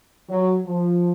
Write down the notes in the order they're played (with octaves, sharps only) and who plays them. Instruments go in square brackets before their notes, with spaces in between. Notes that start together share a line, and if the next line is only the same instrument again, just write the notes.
[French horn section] F#3
F3